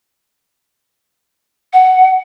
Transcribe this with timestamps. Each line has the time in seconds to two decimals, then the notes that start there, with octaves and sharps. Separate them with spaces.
1.73 F#5